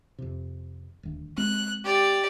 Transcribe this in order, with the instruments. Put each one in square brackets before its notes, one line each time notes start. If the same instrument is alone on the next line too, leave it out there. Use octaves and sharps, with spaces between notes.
[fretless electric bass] F2 C3
D#1 D2
[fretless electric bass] G#3 C4 [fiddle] F#6
[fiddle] G4 D5